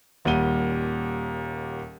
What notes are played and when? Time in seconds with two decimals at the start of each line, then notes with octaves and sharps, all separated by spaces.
0.25 D#1 D#2 G3 F#5 D#7 G7